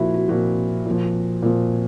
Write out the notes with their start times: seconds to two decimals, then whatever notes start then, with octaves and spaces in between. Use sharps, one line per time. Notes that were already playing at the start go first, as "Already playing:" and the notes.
Already playing: A#2 F3 E4 F#4
0.14 F#4
0.28 A#2 F3 F#4
0.86 A#2 F3
1.42 A#2 F3